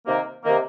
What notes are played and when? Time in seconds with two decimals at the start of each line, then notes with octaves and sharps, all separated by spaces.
0.06 C3 D#3 A#3
0.44 C3 D#3 A#3